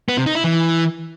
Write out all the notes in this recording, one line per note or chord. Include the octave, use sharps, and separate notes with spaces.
B3
C3
D#4
E4
E3